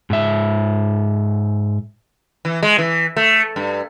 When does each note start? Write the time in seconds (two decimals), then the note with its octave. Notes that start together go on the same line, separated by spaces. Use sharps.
0.10 G#2 E5
2.45 E3
2.63 G#3
2.78 E3
3.17 A3
3.56 G2